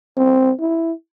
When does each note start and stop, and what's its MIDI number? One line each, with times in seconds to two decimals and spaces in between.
0.17 0.52 60
0.60 0.92 64